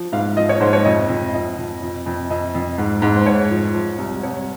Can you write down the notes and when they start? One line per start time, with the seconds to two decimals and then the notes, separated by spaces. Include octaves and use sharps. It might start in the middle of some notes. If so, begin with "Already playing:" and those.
Already playing: F3
0.12 G#2 F5
0.36 F3 D#5
0.49 C#5
0.60 G#2 C5
0.73 C#5
0.85 F2 D#5
1.09 F2
1.33 F2 D#5
1.58 F2
1.82 F2
2.06 F2
2.30 F2 D#5
2.55 F2
2.78 G#2
3.02 G#2
3.16 C5
3.26 G#2 C#5
3.50 F3
3.74 F3
3.98 C2
4.23 C2 C#5